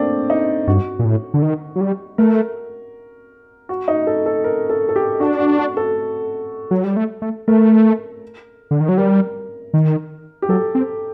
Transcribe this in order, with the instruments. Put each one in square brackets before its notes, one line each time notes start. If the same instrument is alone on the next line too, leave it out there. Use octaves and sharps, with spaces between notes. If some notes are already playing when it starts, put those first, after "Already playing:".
Already playing: [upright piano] A3 A#3 C4 D4
D#4
[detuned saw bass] G2 [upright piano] F#4
[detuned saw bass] A#2
A2
D3
D#3
F#3
G3
[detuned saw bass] A3 [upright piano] A#4
[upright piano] F#4
D#4
A4
A4
A#4
A4
A4
G4
[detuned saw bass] D4 [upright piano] F#4
[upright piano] F#4
F#4
A4
[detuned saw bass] F#3
G3
A3
A3
[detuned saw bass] A3 [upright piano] A#4
[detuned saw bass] D3
D#3
F#3
[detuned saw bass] G3 [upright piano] A#4
[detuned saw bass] D#3
[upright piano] G4
[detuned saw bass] F#3 [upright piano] A4
[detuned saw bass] C4